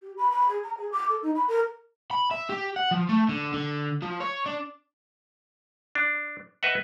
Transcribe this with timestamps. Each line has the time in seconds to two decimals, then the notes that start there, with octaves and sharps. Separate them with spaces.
0.02 G4
0.16 B5
0.30 B5
0.48 G#4
0.63 A#5
0.77 G#4
0.91 D6
1.09 A4
1.22 D#4
1.34 B5
1.48 A#4
2.11 B5
2.31 E5
2.49 G4
2.76 F#5
2.91 F3
3.09 A3
3.29 D3
3.53 D3
4.02 F3
4.20 C#5
4.46 D4
5.95 D4
6.63 B4 D#5 E5 F#5